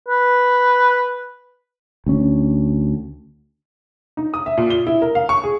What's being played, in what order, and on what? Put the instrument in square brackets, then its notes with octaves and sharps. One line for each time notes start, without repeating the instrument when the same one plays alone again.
[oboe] B4
[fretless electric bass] D2 C#4
[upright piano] D#4
D#6
E5
A#2
G7
E4
A#4
F5
C#6
G#4